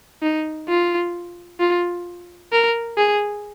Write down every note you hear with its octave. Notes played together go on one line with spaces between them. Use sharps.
D#4
F4
F4
A#4
G#4